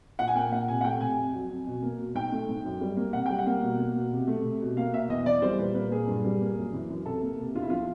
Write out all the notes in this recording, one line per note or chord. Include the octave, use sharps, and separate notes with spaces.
A#2 F#5
G#5
A#3 G5
A#2 F#5
C3 G#5
F#5
A3 G5
C3 G#5
F2
F#3
F2
B2
A#3
B2
G#2 G5
A3
G#2
F#2
G3
A#3
C3 F#5
G3 G5
F#5
A#3
B2
A#3
B2
C3
A3
C3
B2
A#3 F5
B2 E5
E2 D#5
E3 D5
G3 C5
A#2 B4
A#3 B4
A#2 G#4
G2
G3
A#3
F#2
E3
F#2
C3 A4
A#3
C3
E2 F4
E4
F3 F4